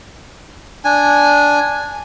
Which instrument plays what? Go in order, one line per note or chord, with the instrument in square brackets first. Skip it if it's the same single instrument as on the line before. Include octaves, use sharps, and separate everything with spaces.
[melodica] D4 G#5